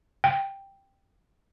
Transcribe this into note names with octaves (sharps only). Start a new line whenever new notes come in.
G5